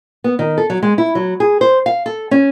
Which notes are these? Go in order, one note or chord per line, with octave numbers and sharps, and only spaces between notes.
B3
D#3
A4
F#3
G#3
E4
F#3
G#4
C5
F5
A4
C#4